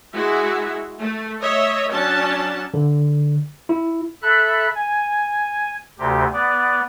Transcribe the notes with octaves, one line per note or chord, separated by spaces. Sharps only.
G#3 E4 F#4 E5
A3
C#5 D#5 E5
F#3 C#4 D4 A5
D3
E4
A4 E5 B5 F#6
G#5
D2 C3 G4
B3 D5